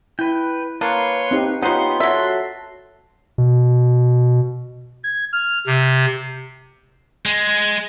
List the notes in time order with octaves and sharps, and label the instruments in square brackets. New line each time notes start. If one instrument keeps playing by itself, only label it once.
[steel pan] E4 [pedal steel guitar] B4 G5
[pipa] A#3 [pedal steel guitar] B4 [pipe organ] C#5 C6 [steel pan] A5
[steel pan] C4 D#4 G4
[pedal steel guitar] B3 G4 [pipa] D#4 C5 [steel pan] F4 C#5 F#5 [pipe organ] C6
[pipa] F#3 E5 [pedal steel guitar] F#4 A4
[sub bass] B2
[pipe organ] G#6
F6
C3
[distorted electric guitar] G#3